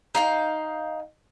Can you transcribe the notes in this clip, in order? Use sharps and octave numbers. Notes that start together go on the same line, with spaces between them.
D#4 F5 G5